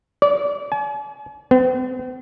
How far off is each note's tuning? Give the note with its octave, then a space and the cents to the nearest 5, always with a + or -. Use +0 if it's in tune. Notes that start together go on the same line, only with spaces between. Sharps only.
D5 -30
G#5 +45
C4 -45